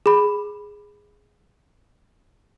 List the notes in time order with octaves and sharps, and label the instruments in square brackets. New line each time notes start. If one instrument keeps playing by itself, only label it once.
[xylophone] G#4 B5